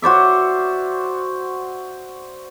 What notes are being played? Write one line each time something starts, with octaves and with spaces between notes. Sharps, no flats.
F#4 C5 D5 E5